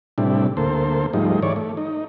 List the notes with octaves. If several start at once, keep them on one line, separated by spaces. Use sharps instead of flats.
A2 C3 G3 D4 E4
D2 A#3 A4 C5
G#2 F3 G3 A3 D#4
E3 C#5 D5
A3
D#4